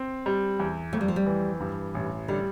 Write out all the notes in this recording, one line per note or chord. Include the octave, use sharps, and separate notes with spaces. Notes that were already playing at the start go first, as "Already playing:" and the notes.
Already playing: C4
G3
E2
F2 A3
G3
F3
G3
E3
G2
A1
D3 G3